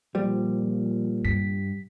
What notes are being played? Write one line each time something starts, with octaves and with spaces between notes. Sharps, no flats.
A#2 F3 G3
G2 B6